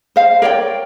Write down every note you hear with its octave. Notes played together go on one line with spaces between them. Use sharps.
C5 F5
A#4 C#5 D5 G5